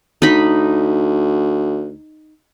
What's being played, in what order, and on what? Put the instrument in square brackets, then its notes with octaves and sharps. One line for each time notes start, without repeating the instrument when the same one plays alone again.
[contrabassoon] D2 [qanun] D#4 B5